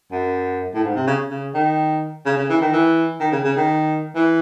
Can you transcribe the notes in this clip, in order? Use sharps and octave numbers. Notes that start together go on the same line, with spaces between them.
F#2
A2
G#2
C3
C#3
C#3
D#3
C#3
C#3
E3
D#3
E3
D#3
C#3
C#3
D#3
E3